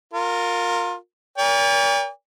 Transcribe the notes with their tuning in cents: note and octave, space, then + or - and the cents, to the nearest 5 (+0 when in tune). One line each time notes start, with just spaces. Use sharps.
F4 +20 A#4 -15
A#4 +30 D5 -45 G5 +45